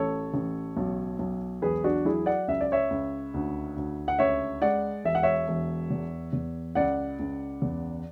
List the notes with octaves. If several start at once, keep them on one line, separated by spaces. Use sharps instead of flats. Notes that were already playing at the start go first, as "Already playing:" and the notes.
Already playing: A1 A4 C#5
A1
B1
B1
E1 G#4 B4
D4 F#4
F#3 E4 G#4
D5 F#5
C#2 E5
D5
C#5 E5
C#2
D2
D2
F#5
C#2 C#5 E5
G#3 D5 F#5
E1 E5
F#5
C#5 E5
E1
E2
E2
C#2 D5 F#5
C#2
E2